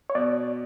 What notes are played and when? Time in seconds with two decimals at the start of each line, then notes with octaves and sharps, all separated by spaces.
0.10 C#5
0.15 B2 D5